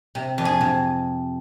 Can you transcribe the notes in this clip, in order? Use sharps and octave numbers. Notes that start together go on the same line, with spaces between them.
C3
F2
G#4
C3